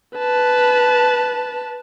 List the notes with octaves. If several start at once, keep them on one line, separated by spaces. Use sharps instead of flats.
B4 A5